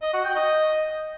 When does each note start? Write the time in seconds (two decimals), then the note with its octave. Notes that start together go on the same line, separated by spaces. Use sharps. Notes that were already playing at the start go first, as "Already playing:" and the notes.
0.02 D#5
0.14 F#4
0.25 G5
0.36 D#5